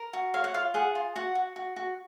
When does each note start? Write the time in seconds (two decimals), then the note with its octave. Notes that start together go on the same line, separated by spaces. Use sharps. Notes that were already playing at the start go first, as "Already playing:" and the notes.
Already playing: A#4
0.13 F#4
0.34 C#5 F5
0.44 F#5
0.54 F4 F5
0.74 G#4 F#5
0.95 F4
1.16 F#4 F#5
1.35 F#4
1.56 F#4
1.76 F#4